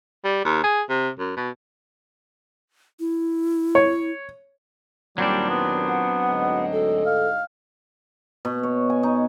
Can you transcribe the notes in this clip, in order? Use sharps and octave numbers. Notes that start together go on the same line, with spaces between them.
G3
D#2
G#4
C3
F#2
B2
E4
C#5
D#2 A#2 F#3 G3 C4 D4
B3
F#5
D2 G#2 D#5
A4
F5
B2
C#5
G#5
D#4